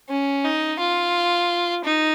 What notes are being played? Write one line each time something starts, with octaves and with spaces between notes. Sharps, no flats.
C#4
D#4
F4
D#4